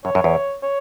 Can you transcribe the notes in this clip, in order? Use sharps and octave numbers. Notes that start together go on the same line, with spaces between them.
F#2 C#5
F#2
E2
C#5